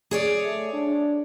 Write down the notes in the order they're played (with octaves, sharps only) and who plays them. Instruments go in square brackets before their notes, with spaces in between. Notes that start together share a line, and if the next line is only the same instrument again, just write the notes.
[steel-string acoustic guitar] G#4 C#5 D5
[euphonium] A3
D4